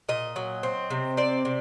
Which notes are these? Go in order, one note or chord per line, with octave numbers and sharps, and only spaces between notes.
A#2 D#5
F#3
C4
C3
C4 D5
C3